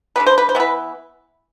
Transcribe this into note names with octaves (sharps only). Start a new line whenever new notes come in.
D3 G3 B3 B4
C5
B4
C5
E3 B3 B4